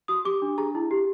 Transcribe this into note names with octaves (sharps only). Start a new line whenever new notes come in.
F#4 D#6
G4 D6
D4
G#4 A#5
E4
G4